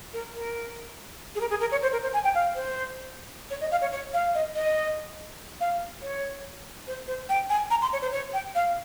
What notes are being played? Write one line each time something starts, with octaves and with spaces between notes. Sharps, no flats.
A#4
A#4
G#4
A#4
G#4
A#4
C#5
C5
A#4
C5
G#5
G5
F5
C5
C#5
D#5
F5
C#5
C#5
F5
D#5
D#5
F5
C#5
C5
C5
G5
G#5
A#5
C6
C#5
C5
C#5
G5
F5